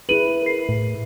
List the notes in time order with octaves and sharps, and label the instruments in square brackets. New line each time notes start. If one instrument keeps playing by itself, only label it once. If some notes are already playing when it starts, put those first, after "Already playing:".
[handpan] E4 B4 [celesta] G#4 D#7 F#7
[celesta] A#4 C7
[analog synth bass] A2